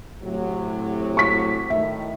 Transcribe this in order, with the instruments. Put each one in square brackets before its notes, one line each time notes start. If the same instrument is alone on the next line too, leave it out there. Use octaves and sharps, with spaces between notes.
[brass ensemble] A2 C3 F#3
[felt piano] C#6 B6
[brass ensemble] A2 D#3 [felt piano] E5